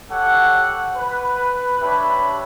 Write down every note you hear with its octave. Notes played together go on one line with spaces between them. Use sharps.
G4 A4 C#5 F#5
B4
D4 G4 B4 C#5 E5 B5